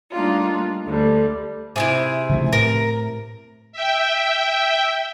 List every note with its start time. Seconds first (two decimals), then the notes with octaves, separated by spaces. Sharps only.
0.12 G3 A3 A#3 D4 D#4 F4
0.85 D2 D3 G3
1.76 C3 E4 F4 G#4
2.29 C#3 F3 A3
2.53 A2 A#4
3.72 E5 G5